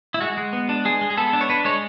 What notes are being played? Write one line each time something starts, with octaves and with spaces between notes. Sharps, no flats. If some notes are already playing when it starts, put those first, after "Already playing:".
E4
G#3 F#4
G#3
B3
D4
G#3 G#4
G#3
G#4
B3 A4
D4
C#5
D4 B4
G#3 C#5